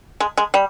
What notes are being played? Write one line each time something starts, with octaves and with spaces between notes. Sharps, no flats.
G#3
G#3
G3